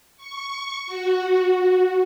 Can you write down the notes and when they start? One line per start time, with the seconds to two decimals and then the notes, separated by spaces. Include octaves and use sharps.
0.17 C#6
0.87 F#4